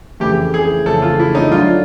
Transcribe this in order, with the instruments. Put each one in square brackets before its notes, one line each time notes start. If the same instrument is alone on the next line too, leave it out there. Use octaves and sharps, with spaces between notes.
[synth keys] F2 C#3 E3 A3 [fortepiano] G4
[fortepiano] G#4
[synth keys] F2 C#3 E3 A3 [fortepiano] A4
[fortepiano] F4
E4
D#4
[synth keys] G2 D3 F#3 A3 D4 [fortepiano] F4